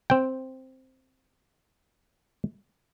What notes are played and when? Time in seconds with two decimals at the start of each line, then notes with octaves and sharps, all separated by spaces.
0.10 C4 G5